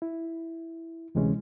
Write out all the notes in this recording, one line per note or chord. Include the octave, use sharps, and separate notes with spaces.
E4
D2 C3 E3 G#3 C#4